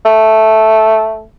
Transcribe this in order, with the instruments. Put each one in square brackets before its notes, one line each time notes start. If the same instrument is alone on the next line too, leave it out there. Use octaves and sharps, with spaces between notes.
[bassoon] A3